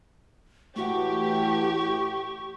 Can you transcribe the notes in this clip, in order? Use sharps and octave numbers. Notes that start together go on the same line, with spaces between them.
A2 E3 A3 F#4 G4 F#5 C#6